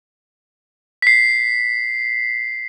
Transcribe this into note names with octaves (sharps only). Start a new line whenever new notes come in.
B6 C7